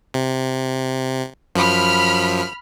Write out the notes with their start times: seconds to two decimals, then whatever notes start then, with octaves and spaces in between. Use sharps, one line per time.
0.14 C3
1.55 F#2 F3 B5 F6